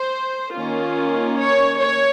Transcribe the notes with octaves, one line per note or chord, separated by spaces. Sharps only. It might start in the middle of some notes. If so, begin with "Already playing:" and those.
Already playing: C5
D#3 A#3 C#4 F4
C#5
C#5